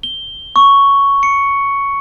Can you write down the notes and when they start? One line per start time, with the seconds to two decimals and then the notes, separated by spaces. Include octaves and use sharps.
0.03 G7
0.56 C#6
1.23 C#7